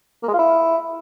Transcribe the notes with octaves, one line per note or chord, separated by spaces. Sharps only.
A#3
G#3
F4
E4